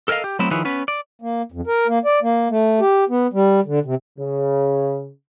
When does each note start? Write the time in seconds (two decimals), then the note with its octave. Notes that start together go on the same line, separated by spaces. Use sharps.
0.08 A4 A#4 C#5 D#5 F5
0.24 G4
0.39 F#3 A3 B3 C4 E4
0.51 D#3 F3 E4 G#4 B4 C#5
0.65 B3 C#4 B4
0.88 D5
1.22 A#3
1.52 F2
1.67 A#4
1.88 A#3
2.05 D5
2.22 A#3
2.50 A3
2.80 G4
3.09 B3
3.33 G3
3.66 D3
3.85 C3
4.19 C#3